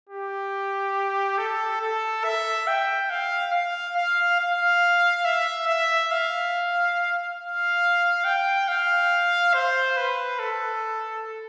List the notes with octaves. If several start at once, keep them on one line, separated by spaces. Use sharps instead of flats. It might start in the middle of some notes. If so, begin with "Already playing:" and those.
G4
A4
A4
E5
G5
F5
F5
F5
F5
E5
E5
F5
F5
G5
F5
C5
B4
A4